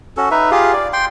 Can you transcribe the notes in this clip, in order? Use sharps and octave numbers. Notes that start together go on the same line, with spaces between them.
C#4 F#4 A4
D#4 B4 E5
F4 G4 G#4 F5
D5
G5 C6